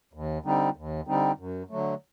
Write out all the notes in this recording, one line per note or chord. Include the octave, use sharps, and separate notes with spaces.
D#2
D3 G3 C4 D#4
D#2
D3 G3 C4 D#4
F#2
D3 F#3 A3